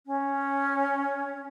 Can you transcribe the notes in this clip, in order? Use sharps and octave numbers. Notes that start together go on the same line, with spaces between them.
C#4